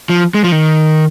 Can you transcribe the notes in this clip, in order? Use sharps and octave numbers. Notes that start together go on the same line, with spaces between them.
F3
G#3
F3
D#3